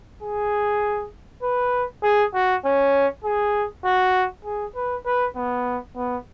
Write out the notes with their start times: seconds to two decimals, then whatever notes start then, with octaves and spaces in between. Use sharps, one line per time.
0.22 G#4
1.43 B4
2.03 G#4
2.34 F#4
2.64 C#4
3.24 G#4
3.84 F#4
4.45 G#4
4.75 B4
5.06 B4
5.36 B3
5.96 B3